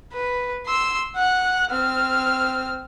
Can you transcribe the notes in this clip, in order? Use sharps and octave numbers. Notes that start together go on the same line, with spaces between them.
B4
C6 E6
F#5 F#6
C4 F6